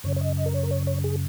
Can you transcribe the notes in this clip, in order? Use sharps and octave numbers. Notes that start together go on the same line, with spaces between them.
F#2 C#3 C#5
C#5
D#5
D#5
A#4
C#5
A#4
C#5
C#5
G#4